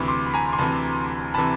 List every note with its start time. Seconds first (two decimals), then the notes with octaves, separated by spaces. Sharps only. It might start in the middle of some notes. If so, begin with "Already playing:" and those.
Already playing: D2 C3 E3 B5 C#6
0.08 C6 D6
0.26 B5
0.34 G#5 A#5
0.53 C6
0.58 D2 C3 E3 A5 B5
1.34 C3 E3 A5 B5